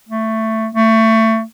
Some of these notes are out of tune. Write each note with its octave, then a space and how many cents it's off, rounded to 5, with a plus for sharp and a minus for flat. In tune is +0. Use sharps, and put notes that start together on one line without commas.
A3 +10
A3 +25